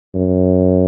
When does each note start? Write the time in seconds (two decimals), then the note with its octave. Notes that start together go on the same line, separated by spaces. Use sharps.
0.15 F#2